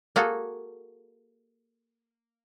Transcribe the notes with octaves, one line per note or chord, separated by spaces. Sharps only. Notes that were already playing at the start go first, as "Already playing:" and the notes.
A#3 F#4 G#4 A4